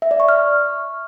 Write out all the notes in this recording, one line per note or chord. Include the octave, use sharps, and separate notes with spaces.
E5
D5
C#6
F6